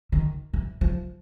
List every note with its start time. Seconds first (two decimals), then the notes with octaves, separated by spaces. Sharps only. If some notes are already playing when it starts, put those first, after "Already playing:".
0.12 D#3
0.53 E3
0.81 F3